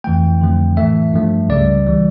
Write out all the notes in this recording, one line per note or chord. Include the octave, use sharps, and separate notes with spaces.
F2 E3 A3 G5
F2 D3 F3 A3
A2 E3 A3 E5
G2 F3 A3
C#2 C#3 G3 D5
E3 G3